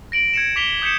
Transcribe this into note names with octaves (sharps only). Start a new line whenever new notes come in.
A#6 D7 F#7
G#6 C#7 E7
D6 B6 F7 G7
D#6 G6 B6 C#7 E7